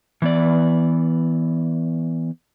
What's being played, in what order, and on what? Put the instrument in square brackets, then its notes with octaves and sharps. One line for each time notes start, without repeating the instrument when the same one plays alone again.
[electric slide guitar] E3 B3 D5